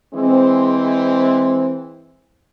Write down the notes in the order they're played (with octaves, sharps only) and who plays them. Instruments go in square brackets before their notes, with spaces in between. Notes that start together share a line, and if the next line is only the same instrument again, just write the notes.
[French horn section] E3 G#3 C4